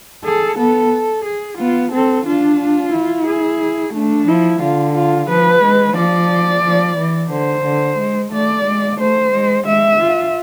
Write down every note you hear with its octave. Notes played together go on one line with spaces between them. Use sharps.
G#4 A4
B3 A4
G#4
B3 F4
C4 A4
D4 F4
F4
E4
G#4
A3 D4
F3 E4
D3 F4
F4
F3 B4
G#3
F3 D5
F3
E3
D3 C5
D3
G#3
A3 D5
G#3
A3 C5
G#3
G#3 E5
F4